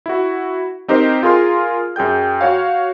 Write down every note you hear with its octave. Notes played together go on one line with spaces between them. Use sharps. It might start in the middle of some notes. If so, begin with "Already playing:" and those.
E4 F#4
C4 D#4 G4 A#4 C5
F4 G#4 A#4 C6 F6
F#2 G#4 G5 G6
F#4 C#5 F5